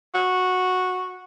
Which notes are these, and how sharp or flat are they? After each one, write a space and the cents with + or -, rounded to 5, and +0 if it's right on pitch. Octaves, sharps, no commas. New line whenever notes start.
F#4 -10